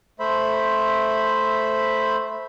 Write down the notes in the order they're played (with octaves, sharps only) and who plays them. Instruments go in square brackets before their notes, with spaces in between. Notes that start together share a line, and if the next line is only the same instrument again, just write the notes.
[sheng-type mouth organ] A3 C5 E5 B5